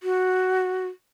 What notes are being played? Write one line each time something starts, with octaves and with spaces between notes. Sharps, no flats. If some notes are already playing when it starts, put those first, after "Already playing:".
F#4